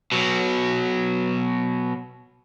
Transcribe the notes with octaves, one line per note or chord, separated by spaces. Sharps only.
B2 F#3